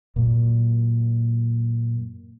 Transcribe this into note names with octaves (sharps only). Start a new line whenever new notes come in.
F#2 A#2 A#3